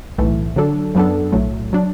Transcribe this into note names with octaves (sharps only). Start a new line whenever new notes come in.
B1 A2 E3 A3
D3 F#3 D4 A4
F#2 F#3 B3 D4 A4
B1 A2 F#3 A3
F#3 D4